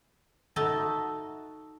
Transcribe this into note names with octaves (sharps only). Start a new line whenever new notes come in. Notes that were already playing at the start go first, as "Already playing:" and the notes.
D#4 F#4 A4 D#5 E5 A5